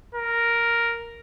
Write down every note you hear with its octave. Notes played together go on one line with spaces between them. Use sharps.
A#4